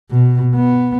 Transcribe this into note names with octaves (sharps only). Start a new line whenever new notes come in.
B2
B3